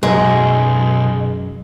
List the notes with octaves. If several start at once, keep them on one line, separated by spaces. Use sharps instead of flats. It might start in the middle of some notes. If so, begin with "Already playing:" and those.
B1 F#2 G#3